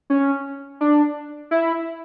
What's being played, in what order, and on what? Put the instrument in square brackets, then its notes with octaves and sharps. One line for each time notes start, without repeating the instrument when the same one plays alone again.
[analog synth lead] C#4
D4
E4